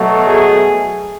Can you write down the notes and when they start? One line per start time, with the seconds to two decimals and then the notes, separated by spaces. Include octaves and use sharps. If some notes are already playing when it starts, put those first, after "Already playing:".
Already playing: B2 F#3 A3
0.26 G#4